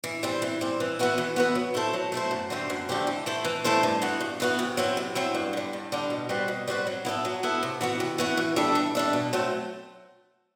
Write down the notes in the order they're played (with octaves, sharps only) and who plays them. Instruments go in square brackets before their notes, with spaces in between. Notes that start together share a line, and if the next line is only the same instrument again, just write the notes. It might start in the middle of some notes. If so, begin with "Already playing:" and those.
[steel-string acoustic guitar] E3
G3 C4
E3
G3 C4
E3
B3 F#4 B4 E5
E3
B3 F#4 B4 E5
F#3
A3 E4 A4 C5
F#3
A3 E4 A4 C5
F#2
D3 A3 C4 G4
F#2
D3 A3 C4 G4
E3
A3 E4 A4 C5
E3
A3 E4 A4 C5
G2
E3 B3 F#4
G2
E3 B3 F#4
C3
F#3 C4 E4
C3
F#3 C4 E4
G2
D3 G3
G2
D3 G3
B2
G3 C4 F#4 B4
B2
G3 C4 F#4 B4
F#3
B3 E4 A4 E5
F#3
B3 E4 A4 E5
C3
E3 B3 F#4
C3
E3 B3 F#4
E3
G3 D4 A4 E5
E3
G3 D4 A4 E5
B2
F#3 A3 C4